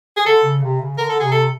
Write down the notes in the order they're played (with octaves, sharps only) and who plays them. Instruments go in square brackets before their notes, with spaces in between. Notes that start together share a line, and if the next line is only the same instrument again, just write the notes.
[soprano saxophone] G#4
[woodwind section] D3 [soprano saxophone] A4
[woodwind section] C#3
C3
C#3
[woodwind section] D3 [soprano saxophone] A#4
[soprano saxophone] A4
[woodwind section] C3 [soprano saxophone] G#4
[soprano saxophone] A4